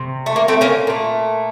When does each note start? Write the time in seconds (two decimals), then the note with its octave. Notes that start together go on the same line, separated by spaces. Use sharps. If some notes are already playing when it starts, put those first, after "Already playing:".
Already playing: C3
0.26 A3
0.36 A#3
0.48 A3 C4
0.61 A#3 C#4
0.87 A#2 A3